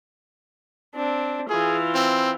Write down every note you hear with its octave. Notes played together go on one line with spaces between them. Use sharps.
C4 D4
E3 F4 G#4
C4